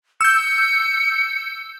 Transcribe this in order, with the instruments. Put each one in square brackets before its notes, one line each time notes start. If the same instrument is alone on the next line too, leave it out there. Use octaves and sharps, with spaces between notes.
[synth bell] E6 G6 [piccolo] C#7